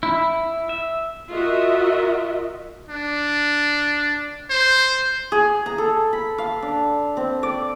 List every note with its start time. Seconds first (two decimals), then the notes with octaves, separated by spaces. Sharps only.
0.03 E4
0.69 E5
1.30 F4 F#4 A#4 D#5 E5
2.89 D4
4.50 C5
5.32 G#4
5.66 A#5
5.78 A4
6.13 B5
6.38 F5
6.62 D4
7.17 C4
7.43 D5